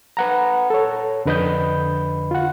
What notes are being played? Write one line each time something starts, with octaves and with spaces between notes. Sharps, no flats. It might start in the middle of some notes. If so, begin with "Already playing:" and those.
B4 F#5 A#5
A4 C#5
F2 D3 B4 D#5 B5 G6
F4 F#5